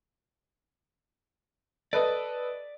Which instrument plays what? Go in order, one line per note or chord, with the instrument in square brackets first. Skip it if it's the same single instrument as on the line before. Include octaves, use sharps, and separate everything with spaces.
[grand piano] A4 B4 D#5 [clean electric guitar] D5